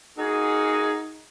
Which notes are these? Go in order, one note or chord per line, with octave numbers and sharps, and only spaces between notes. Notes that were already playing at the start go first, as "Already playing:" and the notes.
A#3 D#4 F#4 G#4